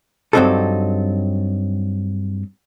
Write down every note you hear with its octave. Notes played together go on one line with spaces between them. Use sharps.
G2 F#3 A#3 C4 D#4 A4